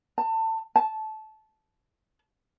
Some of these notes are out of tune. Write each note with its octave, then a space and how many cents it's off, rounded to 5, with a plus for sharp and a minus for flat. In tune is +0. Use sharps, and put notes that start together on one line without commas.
A5 +25
A5 -15